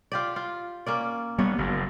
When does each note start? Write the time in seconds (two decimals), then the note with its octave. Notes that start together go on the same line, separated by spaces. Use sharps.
0.12 F4 G4 D5
0.36 F4
0.86 A#3 C#4 D5
1.39 G3 B3 C#5
1.58 F#1 F#2